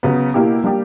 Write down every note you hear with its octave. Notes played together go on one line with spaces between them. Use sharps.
C#3 F#3 B3
B2 A#3 E4 G4
G3 A#3 D4 G4